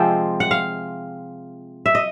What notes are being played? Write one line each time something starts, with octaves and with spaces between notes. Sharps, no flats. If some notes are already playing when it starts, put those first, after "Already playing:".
Already playing: C3 F3 G#3 C4
F#5
F5
E5
D#5